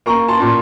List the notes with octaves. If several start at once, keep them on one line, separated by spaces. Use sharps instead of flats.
A#3 A#5 C#6
A5 C6
A#2